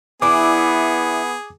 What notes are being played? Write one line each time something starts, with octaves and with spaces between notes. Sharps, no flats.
E3 B3 D4 E4 G#4 D6